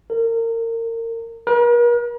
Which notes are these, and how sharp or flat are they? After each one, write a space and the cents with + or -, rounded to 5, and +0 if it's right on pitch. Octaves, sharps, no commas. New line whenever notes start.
A#4 -30
A#4 +45